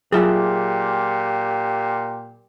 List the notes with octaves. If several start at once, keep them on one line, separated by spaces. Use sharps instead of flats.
A#2 F#3 F4 G4 G#4 E5 A5